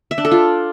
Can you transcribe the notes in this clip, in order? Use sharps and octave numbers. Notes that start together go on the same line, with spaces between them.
E5
D4
A4
F4